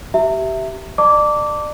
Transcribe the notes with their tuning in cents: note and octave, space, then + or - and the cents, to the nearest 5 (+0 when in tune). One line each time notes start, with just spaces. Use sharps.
G4 -20 E5 +0 A#5 -35
D5 +30 A5 +40 D6 -15